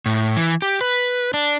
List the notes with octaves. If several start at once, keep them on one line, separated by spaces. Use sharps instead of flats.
A2
E3
G4
B4
D4